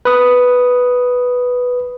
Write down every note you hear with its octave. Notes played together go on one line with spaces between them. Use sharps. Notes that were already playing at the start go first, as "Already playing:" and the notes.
B4 D#6